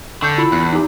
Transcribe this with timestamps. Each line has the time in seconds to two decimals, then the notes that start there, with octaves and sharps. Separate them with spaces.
0.22 D3 C#6 G6
0.38 E4 F4 B5
0.52 E2 F#6
0.73 D#4 G4